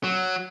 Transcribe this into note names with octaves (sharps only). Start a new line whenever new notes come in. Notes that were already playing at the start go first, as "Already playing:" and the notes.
F#3